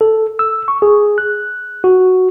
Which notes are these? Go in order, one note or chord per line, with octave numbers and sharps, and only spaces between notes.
A4
E6
C#6
G#4
F#6
F#4